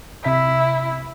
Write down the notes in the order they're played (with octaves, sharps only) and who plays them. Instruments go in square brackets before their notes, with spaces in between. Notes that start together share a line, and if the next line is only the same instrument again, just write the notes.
[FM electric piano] C3 E5 B6 [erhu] E4